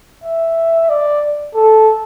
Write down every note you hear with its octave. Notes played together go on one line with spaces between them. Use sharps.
E5
D5
A4